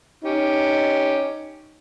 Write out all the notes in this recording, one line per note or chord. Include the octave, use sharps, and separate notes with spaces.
C#4 D#4 G4